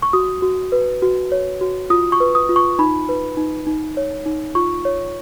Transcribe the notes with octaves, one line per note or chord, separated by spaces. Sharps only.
C#6
F#4 D#6
F#4
B4
F#4
C#5
F#4
F4 D#6
C#6
B4
D#6
F4
C#6
D#4 B5
B4
D#4
D#4
C#5
D#4
F4 C#6
C#5